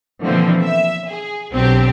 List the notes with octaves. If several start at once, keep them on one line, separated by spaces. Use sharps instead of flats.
B2 D3 E3 F3 A#3 C4
E5
G#4
B1 F#3 C4 D4 G4